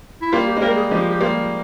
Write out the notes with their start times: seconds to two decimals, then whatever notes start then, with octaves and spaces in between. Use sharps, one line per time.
0.22 E4
0.33 G3 A#3 F4
0.47 G4
0.57 G#3
0.62 G3 A#3 A#4
0.76 G#4
0.91 F3 G#3 G4
1.10 G4
1.20 G3 A#3 F4